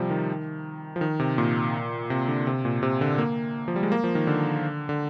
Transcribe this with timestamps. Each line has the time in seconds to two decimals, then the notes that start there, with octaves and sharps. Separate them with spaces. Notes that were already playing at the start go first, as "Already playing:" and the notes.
Already playing: C3 F3 G3
0.10 D#3
0.96 F3
1.01 D#3
1.20 C3
1.38 A#2
2.10 C3
2.28 D3
2.47 C3
2.65 A#2
2.83 C3
3.01 D3
3.18 A#3
3.68 F3
3.76 G3
3.83 G#3
3.92 A#3
4.04 F3
4.15 D#3
4.27 D3
4.89 D3